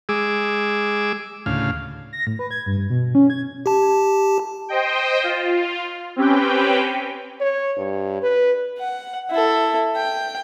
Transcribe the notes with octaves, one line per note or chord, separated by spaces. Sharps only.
G#3 G#4 D6 E6
D2 A2 C#3 F5
A#6
A2
B4
G#6
G2
G2
B2
C#4
G#6
G4 A5
C5 D#5 G5
F4
C4 C#4 G4 B4 G5
C#5
G2
B4
F#5
E4 A4
G5